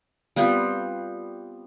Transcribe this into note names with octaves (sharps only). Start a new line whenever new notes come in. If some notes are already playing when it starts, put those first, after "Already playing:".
G3 B3 C4 F4